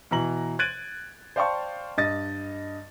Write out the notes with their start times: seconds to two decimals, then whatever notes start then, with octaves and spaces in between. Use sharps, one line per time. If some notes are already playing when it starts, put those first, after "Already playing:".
0.11 B2 E3 A#5 F#7
0.59 F#6 G#6 A6 D7 D#7 F#7
1.36 C5 D5 F5 G5 A5 C#6
1.97 G2 D#5 A6